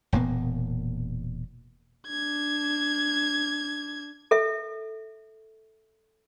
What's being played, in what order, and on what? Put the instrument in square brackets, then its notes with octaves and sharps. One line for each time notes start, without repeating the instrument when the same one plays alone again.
[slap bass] E1 A#2 A#3 B3
[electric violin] D4 G#6
[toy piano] A4 E5